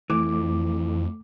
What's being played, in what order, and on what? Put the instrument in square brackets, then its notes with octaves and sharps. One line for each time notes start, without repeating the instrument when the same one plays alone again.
[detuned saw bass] F2 [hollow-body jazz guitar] E3 [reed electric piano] A3 D6